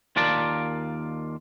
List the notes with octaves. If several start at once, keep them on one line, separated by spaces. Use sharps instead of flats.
D#2 F4 A#4 D5 A5